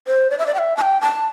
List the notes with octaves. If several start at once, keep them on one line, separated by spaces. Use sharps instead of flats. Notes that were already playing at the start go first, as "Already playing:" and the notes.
C5
D5
E5
D5
G5
E5
A5
G5
A5